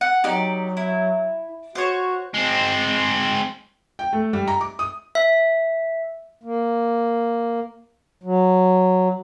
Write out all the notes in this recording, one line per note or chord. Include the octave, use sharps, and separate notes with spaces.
F#5
F#3 D#4 G4 D5
E4
F#4 C5 C#5
G#3 C4
G5
A3
G3
A#5
D6
D#6
E5
A#3
F#3